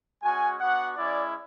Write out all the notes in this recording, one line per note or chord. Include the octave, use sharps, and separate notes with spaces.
G#3 C#4 F#4 G#5
B3 D4 F#4 F#5
G#3 C#4 E4 D5